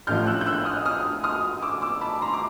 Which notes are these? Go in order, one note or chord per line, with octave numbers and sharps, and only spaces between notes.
A1 A2 F3 F6 G6
E6 F#6
G6
E6 F#6
D#6 F6
D#6 F6
D#6 F6
D6 E6
D6 E6
A5 B5
A#5 C6
D6